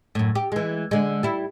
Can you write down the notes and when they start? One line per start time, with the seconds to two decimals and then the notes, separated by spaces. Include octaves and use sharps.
0.15 F#2 A2
0.35 G4
0.52 E3 G#3
0.91 D3 G#3
1.23 G3 E4